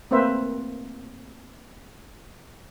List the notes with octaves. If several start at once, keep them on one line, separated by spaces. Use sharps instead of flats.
A3 A#3 C4 B4 C5 E5